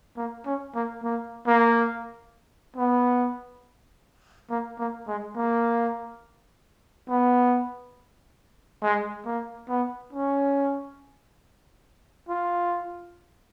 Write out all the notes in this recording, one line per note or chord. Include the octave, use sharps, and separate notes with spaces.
A#3
C#4
A#3
A#3
A#3
B3
A#3
A#3
G#3
A#3
B3
G#3
A#3
B3
C#4
F4